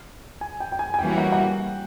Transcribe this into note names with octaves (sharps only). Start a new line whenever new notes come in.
G#5
G5
G5
G#5
G#5
E3 G3 A#3 C#4 F#4 G5
F#5
F#5
G5